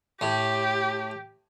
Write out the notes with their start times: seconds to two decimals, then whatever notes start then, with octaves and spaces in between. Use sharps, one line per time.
0.21 A2 G4